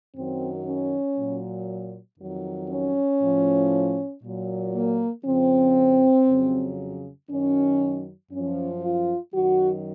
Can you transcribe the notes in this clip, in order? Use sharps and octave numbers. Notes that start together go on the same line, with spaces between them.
F#2 D#3 F#3 C4
C#4
A#2 F#3
F2 D#3 F#3
C#4
A2 F3
A#2 F#3
A#3
F2 C#3 F3 C4
F2 C#3 F#3
F#2 D#3 F#3 C#4
F#2 F3 C#4
F4
F#2 D#3 F#3 F#4